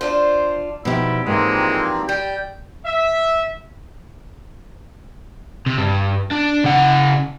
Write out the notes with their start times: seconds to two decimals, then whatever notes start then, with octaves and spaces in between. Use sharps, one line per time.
0.01 D4 F4 C5
0.85 B2 F3 G3 D#4 E4 G4
1.26 G#2 E3 F3 G#3 A#3 C4 F4
2.09 G3 G5
2.85 E5
5.66 C3
5.78 G2
6.31 D4
6.64 C#3 F#5